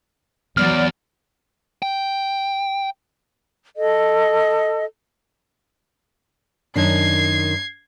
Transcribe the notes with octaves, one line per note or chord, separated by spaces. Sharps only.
E2 F#3 D5 F6
G5
A4 D#5
F#2 D#3 D4 G#6 C7